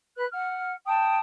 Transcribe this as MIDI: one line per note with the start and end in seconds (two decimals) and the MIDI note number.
0.16 0.26 71
0.16 0.26 90
0.32 0.72 78
0.32 0.72 89
0.86 1.19 79
0.86 1.19 81
0.86 1.19 87